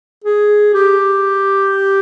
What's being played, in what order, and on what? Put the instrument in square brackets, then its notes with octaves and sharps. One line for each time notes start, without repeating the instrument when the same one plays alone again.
[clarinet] G#4
G4